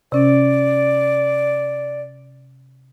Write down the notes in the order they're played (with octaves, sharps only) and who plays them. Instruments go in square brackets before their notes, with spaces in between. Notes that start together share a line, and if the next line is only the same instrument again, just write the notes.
[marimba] C3 C#4 [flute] D5